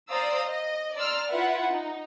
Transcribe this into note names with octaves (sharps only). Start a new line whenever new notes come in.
C5 D5 F5 A#5 D#6 E6
D#5
D5 A#5 C6 E6 F6
E4 F4 B4 E5 F#5
D#4